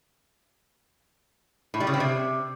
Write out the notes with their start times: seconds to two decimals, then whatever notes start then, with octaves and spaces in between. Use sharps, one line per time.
1.74 A2
1.80 G3
1.87 C#3
1.94 C4
2.00 C3